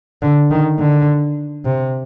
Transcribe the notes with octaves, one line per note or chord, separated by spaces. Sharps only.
D3
D#3
D3
C3